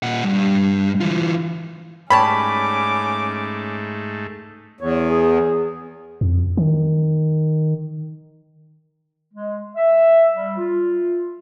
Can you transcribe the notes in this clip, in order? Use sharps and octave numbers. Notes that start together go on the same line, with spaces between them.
A#2 F#5
G2
E3 F4
G#2 G3 A3 C#4 C#5 A5 B5 D6
E2 C#5
G#4
F2
D#3
G#3
E5
G3
F4